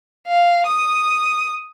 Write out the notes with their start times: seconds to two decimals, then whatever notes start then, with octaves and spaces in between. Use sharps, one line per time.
0.27 F5
0.66 D#6